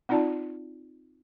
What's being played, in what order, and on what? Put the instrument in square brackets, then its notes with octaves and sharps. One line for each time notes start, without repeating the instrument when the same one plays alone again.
[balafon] C4 D#4 F4 D5 A5